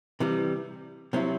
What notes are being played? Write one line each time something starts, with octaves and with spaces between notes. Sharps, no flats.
C3 E3 G3
C3 F#3 C4 E4